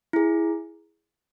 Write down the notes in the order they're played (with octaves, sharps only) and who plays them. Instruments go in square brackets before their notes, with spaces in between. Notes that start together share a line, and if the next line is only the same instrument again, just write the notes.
[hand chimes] E4 G#4